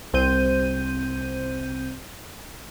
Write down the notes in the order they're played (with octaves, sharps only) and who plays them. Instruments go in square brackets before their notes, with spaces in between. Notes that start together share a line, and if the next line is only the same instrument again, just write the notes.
[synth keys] C2 C4 C5 G6 D#7